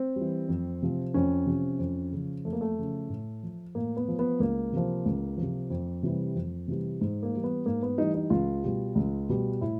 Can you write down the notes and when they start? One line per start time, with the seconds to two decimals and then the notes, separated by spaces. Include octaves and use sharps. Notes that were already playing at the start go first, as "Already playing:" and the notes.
Already playing: C4
0.16 E3 G3
0.49 F2
0.82 C3 F3
1.14 F2 C#4
1.46 C3 F3
1.79 F2
2.12 C#3 F3
2.45 F2 A3
2.53 A#3
2.61 A3
2.78 C#3 F3
3.09 A2
3.43 F3
3.75 A2 A#3
3.97 B3
4.08 F3
4.19 B3
4.40 C#2 A#3
4.73 C3 F3
5.06 C#2
5.37 F3
5.42 C3
5.70 F2
6.03 C3 E3 G3
6.35 F2
6.68 C3 E3 G3
7.01 G#2
7.23 A#3
7.34 E3 G3
7.44 B3
7.66 G#2 A#3
7.83 B3
7.98 E3 G3 D#4
8.14 D#4
8.30 C#2 F4
8.64 B2 G3
8.95 C#2
9.29 B2 G3
9.61 A2 E4